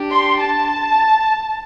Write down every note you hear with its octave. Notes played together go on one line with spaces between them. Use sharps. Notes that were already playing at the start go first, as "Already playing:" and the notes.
Already playing: D4 G4
C6
A5